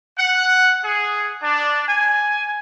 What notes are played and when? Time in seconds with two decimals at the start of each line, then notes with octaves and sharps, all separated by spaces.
0.18 F#5
0.84 G#4
1.42 D4
1.88 G#5